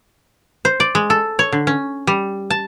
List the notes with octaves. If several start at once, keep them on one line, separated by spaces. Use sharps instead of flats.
C5
D5
G#3
A4
C#5
D3
C#4
G3
A5